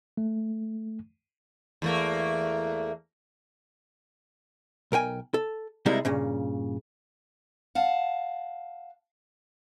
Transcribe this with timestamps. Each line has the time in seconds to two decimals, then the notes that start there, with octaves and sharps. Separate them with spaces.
0.17 A3
1.82 E2 A3 A#3
4.92 B1 A#4 G5 G#5
5.34 A4
5.86 C3 G3 G#3 A#3 D#4 E4
6.05 G2 A#2 C#3
7.75 F5 F#5 A5